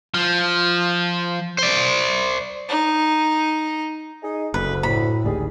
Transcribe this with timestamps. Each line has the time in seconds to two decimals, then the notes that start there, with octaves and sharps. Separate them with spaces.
0.14 F3
1.58 C5 D5
2.69 D#4
4.23 D#4 G#4 D#5
4.54 F#1 D2 B4
4.83 A2 B5
5.24 G#1 D2 D#3 G3 G#4